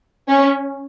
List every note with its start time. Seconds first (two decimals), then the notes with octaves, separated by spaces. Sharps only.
0.29 C#4